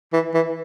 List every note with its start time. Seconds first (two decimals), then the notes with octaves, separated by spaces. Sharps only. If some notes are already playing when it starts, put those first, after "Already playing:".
0.13 E3
0.34 E3